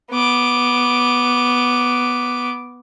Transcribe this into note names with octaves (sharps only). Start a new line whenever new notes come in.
B3 D6